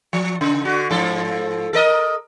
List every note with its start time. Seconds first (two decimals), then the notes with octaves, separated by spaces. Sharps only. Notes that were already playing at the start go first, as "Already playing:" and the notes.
0.13 F3
0.41 C#3
0.64 D3 F#4
0.90 G#2 F3 A4
1.73 A4 A#4 D#5